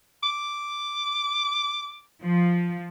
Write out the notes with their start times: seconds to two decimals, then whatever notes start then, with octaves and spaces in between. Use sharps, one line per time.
0.23 D6
2.24 F3